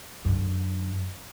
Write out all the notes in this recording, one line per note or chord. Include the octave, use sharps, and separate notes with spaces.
F#2 D3